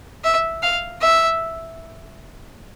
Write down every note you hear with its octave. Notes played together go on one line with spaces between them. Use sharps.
E5
F5
E5